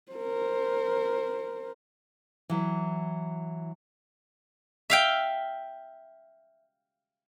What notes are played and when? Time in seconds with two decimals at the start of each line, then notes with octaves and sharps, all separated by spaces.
0.12 A#4 C5
2.50 E3 F#3
4.90 E5 F5 G5